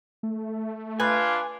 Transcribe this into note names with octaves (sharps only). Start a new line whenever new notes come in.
A3
D4 F4 B4 G#5